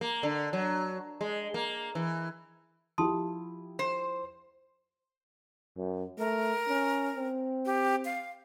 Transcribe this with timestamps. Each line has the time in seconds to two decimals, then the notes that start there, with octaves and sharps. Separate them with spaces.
0.01 A#3
0.23 D3
0.53 F#3
1.21 G#3
1.54 A#3
1.95 E3
2.98 F3 E4 G4 A5 C6 D#6
3.79 C5
5.77 F#2
6.18 A3 A#4
6.68 C#4
7.16 C4
7.66 G4
8.05 F5